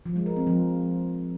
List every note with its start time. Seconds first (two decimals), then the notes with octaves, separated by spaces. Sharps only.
0.06 F3
0.16 G#3
0.26 A#4
0.36 C4
0.47 F3